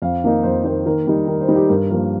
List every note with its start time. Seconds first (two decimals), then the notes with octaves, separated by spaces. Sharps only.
0.02 F2 F5
0.24 D#3 A#3 D#4
0.44 F2 C5
0.64 D#3 A#3 D#4 C5
0.86 D#3 A#4
1.06 G3 D#4 A#4
1.27 D#3 A#4
1.41 C5
1.48 G3 D#4
1.56 G4
1.69 G2 A#4
1.90 F3 A#3 A#4